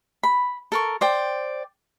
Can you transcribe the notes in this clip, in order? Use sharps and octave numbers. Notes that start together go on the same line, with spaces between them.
B5
A4 A#4 C#6
C5 D5 G5